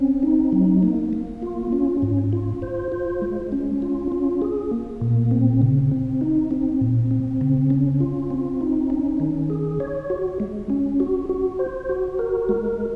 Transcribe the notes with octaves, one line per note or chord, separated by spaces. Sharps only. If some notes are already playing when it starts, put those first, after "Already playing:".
Already playing: C4 C#4
D#4
F#3
A#3
A#3
F4
C#4
G#2
F4
C5
F4
G#3
C#4
F4
C#4
G#4
A#3
A#2
C4
C#3
C4
D#4
C4
A#2
C4
C#3
C#4
F4
C4
D#4
C#4
D#3
G#4
C#5
F#4
G#3
C#4
F#4
F#4
C5
F#4
A#4
G#3